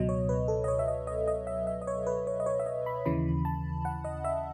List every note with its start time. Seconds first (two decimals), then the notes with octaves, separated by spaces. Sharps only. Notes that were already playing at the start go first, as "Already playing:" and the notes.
Already playing: C#2 B2 F#3 D#5
0.09 C#5
0.29 B4
0.48 A4
0.64 D#5
0.68 C#5
0.79 E5
0.88 D#5
1.07 D#5
1.28 D#5
1.47 E5
1.67 E5
1.82 D#5
1.87 C#5
2.07 B4
2.27 C#5
2.40 D#5
2.46 C#5
2.60 E5
2.66 D#5
2.86 B5
3.06 D#2 C#3 E3 B5
3.45 A5
3.85 F#5
4.05 D#5
4.24 E5